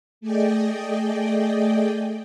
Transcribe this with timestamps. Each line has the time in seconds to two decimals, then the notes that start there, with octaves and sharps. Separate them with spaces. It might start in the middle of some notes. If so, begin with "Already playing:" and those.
0.21 A3 G#4 D5 D#5 G5